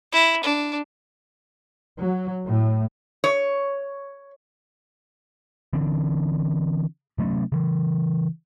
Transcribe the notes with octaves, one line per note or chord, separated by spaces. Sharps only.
E4
D4
F#3
A2
C#5
D3 E3 C4 D4
C3 F#3 A3 C#4
C#3 E3